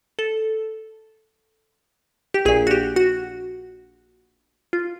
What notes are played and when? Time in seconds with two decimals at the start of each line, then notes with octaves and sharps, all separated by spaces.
0.19 A4
2.34 G4
2.45 A#1 A#2 G#4
2.67 F#4
2.71 G4
2.96 F#4
4.73 F4